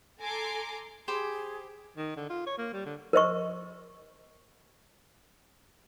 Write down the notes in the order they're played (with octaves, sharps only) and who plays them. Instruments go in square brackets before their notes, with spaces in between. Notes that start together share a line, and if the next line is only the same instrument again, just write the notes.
[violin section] A4 G#5 A#5 C6 D6
[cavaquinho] G4 C5 B5 [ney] G#4
[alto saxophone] D#3
D3
F4
C#5
A#3
G3
D3
[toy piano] A#4 C5 D#5 C#6